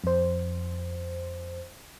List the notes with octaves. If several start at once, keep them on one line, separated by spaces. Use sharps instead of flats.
F2 C5